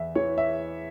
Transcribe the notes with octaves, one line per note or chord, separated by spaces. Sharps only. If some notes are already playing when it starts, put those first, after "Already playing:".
Already playing: E2 E5
E3 C#5
E5